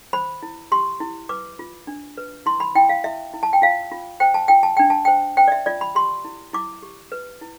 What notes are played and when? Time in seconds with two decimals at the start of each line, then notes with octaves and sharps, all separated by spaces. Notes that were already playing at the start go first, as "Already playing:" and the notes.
0.13 C5 B5
0.43 E4
0.72 G4 C6
1.00 E4
1.29 B4 D6
1.59 F4
1.87 D4
2.17 B4
2.46 E4 C6
2.60 B5
2.75 E4 G5
2.89 F5
3.04 E4 E5
3.34 E4
3.43 A5
3.53 G5
3.62 F4 F5
3.91 F4
4.20 C5 G5
4.34 A5
4.48 F4 G5
4.63 A5
4.77 D4 G5
4.90 A5
5.05 C5 G5
5.37 C5 G5
5.48 D5
5.52 E5
5.66 F4 D5
5.81 B5
5.95 G4 C6
6.25 E4
6.53 E4 D6
6.82 G4
7.12 B4
7.41 E4